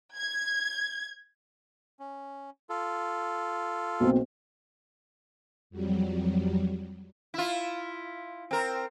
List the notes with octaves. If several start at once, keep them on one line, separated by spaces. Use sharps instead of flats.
G#6
C#4
F4 A4
B1 A#3 C4
F2 F#3 G3
E4 F4
C4 A#4